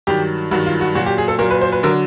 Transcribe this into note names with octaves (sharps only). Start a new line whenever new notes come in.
G2 D#3 F#3 G4
G2 D#3 F#3 F#4
F4
F#4
A#2 F#3 F#4
G4
G#4
A4
A#2 F#3 A#4
B4
C5
B4
D3 F#3 A#4